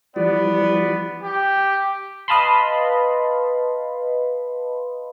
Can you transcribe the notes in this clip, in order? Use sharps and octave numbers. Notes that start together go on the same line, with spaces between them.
E3 F3 G3 B3 D5
G4
B4 D#5 F5 A5 B5 C6